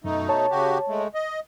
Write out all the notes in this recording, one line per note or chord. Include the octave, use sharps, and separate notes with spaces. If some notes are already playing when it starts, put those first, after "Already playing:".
F#2 B2 A3 D#4
C#5 A5
C#3 F#4 G4
G#3 A3
D#5